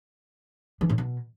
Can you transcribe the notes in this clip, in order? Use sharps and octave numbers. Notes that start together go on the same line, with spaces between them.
E3
A2
B2